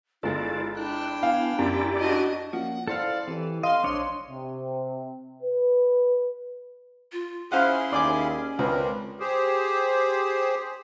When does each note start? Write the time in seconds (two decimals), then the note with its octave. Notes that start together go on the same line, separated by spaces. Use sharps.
0.23 G1 G#3 E4 F4 A4 D5
0.77 D4 E4 G5 F#6
1.23 B3 F5 G#5
1.59 F#2 E4 G4 D5
1.99 D4 F#4 D#5
2.53 F3 A#3 C#4 F#4 F#5
2.88 E4 A4 C5 D5 F5 C#7
3.28 E3 C4 G4 A4
3.63 D#5 F5 C6
3.84 A#1 D4 C5 C#5 D#5 D6
4.29 C3
5.43 B4
7.12 F4
7.52 C#4 E4 G#4 C5 F5 F#5 C6
7.93 D#2 D5 G#5 D6
8.59 C#2 C4 D4 A#4 B4
9.20 G4 G#4 C5